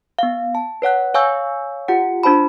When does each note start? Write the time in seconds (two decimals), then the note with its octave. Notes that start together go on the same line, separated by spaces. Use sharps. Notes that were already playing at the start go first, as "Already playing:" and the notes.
0.19 B3 F5
0.55 A5
0.82 B4 C#5 F#5 F#6
1.14 C#5 F5 G#5 C#6 E6 G6
1.88 F4 G4 F#5 C#7
2.23 D4 F4 C5 A5 B5